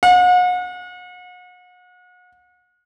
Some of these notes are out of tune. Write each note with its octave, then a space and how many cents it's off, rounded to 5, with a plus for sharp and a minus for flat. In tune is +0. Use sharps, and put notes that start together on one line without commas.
F#5 -40